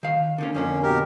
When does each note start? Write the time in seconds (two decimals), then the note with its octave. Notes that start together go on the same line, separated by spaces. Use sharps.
0.03 D#3 F5
0.38 D3 D#3 C#4
0.55 F2 D3 A#3 C#4
0.83 B2 G4 A#4